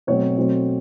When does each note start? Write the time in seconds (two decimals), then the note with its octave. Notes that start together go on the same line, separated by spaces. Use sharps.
0.07 B2 F#3 A3 C4 C#5
0.37 B2 F#3 A3 C4